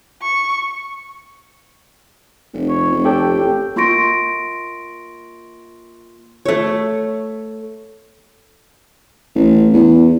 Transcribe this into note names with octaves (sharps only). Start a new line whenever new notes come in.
C#6
F1
C#5
F1
G4 A4 C#5 G5
A1
A#3 F4 C6 C#6 A#6 D7
A3 C#5
A1
E2